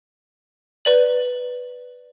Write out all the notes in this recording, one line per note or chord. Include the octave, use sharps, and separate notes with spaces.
B4 D5 F#7